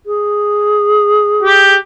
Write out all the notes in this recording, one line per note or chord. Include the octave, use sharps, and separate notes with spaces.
G#4
G4